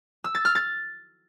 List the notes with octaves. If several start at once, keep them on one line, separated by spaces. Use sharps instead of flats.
E6
A6
F6
A6